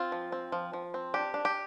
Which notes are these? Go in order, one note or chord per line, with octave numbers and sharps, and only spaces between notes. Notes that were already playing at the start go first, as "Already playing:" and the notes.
Already playing: C4 F4
F3
C4
F3
F3
C4
D4 G4
D4
G4